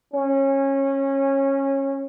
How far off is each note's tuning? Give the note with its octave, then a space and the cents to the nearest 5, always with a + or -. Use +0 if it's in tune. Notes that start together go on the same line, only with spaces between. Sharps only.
C#4 -20